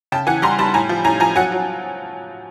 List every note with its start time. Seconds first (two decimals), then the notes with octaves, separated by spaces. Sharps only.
0.12 C#3 G5 A5
0.27 E3 F#5 G#5
0.42 G3 A#5 C6
0.59 G3 A5 B5
0.74 A2 G#5 A#5
0.89 F3
1.04 A2 G#5 A#5
1.20 F3 G#5 A#5
1.36 F#3 F#5 G#5
1.52 F#3